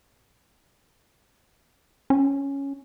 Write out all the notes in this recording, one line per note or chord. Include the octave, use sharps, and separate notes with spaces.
C#4